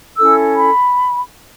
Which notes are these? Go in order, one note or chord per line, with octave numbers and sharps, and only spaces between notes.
C#4 E4 A4 E6
B5